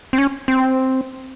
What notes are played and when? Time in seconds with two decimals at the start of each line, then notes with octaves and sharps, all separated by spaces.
0.13 C4
0.18 C#4
0.48 C4